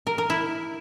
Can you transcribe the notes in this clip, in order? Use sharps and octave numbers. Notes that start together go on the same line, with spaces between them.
A#4
A#4
E4